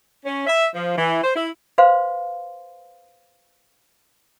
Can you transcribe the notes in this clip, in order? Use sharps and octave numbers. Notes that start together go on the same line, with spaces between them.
C#4
E5
F3
E3
C5
E4
B4 C5 F5 C6